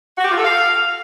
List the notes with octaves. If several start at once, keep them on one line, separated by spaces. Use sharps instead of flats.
F#4
G4
F4
A4
F5